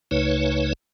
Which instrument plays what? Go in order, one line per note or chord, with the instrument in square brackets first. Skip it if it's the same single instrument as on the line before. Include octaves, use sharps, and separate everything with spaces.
[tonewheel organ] C#2 C#3 A3 D#4 B4 C#5